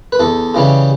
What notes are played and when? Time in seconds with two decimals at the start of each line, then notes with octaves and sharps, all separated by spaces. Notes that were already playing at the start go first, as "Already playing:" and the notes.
0.12 B4
0.19 E2 A4
0.54 C#3 E3 G3 C#4